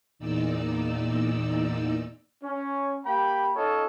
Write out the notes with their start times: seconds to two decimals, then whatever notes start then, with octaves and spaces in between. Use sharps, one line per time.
0.19 E2 A#2 D#4 D5 E6
2.43 C#4
3.05 A#3 G4 G5 B5
3.55 C#4 D#4 F4 A4 C#5 D#5